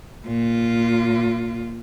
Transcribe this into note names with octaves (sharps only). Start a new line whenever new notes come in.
A#2 F4